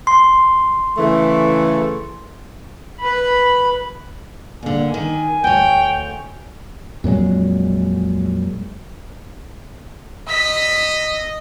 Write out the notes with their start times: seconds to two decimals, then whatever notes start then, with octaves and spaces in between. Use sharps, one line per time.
0.07 C6
0.98 C#3 E3 A3
3.00 B4 B5
4.63 A#2 D3 G#5
4.94 D#3
5.44 D2 C#5 G5
7.04 F2 A#2 F#3 G#3
10.28 D#5 E6 B6